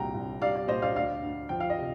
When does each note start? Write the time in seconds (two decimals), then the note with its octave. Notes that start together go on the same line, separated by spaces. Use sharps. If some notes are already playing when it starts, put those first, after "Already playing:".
Already playing: C2 A#2 G3 G5 A#5
0.14 C2
0.42 G3 D5 F5
0.56 D5
0.68 A#2 C5 D#5
0.82 D5 F5
0.96 D2 D5 F5
1.23 D2
1.49 F3 G5
1.60 F5
1.70 D#5
1.77 C3